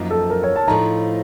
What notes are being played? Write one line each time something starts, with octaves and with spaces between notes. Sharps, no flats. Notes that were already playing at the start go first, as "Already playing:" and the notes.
Already playing: F#2 F3 A#3 D#4
A4
A#4
C#5
A5
A2 F3 A3 D#4 A#5